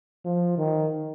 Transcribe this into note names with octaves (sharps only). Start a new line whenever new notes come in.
F3
D#3